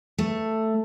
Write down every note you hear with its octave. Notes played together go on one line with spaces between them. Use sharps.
A3